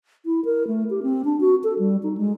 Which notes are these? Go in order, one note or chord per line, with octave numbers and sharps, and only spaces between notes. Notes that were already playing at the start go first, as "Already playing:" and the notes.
E4
A#4
A3
G4
C4
D4
F#4
A4
G3
D#4
G#3